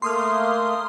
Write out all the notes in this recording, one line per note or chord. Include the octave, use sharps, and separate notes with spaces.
A3 A#3 C6 D#6 F6